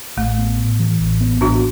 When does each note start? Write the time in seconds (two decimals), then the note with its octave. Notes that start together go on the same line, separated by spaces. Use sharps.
0.17 A1 A3
0.38 B3
0.59 A2
0.79 E3
1.00 A1
1.21 B3
1.41 A1 D4 F#4